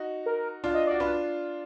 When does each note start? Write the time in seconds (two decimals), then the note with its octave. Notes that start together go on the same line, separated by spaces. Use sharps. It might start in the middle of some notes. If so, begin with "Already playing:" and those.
Already playing: D#4 F#4
0.26 A#4
0.64 D4 F4
0.74 D#5
0.87 F#4 D5
1.00 D4 F4 B4